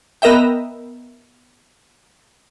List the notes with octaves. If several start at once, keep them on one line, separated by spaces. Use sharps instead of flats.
B3 A#4 D#5 E5 G5